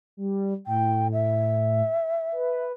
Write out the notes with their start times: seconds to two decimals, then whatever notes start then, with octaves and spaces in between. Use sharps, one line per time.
0.17 G3
0.67 A2 G5
1.13 E5
2.32 B4